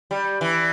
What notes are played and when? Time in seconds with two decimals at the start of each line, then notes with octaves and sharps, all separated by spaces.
0.11 G3
0.41 E3